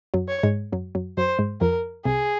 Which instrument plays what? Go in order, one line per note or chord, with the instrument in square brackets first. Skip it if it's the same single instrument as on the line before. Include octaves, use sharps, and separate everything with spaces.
[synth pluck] F#2 F#3
[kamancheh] C#5
[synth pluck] G#2 G#3
F#2 F#3
F#2 F#3
[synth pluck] F#2 F#3 [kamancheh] C5
[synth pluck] G#2 G#3
[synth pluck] F2 F3 [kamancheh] A#4
[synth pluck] C2 C3 [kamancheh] G#4